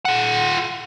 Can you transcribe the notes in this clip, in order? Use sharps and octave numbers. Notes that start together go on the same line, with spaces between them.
F4 F#5